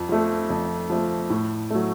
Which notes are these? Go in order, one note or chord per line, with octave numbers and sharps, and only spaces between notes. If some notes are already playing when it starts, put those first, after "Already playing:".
Already playing: F2
F3 A3
F2
F3 A3
A2
F#3 A3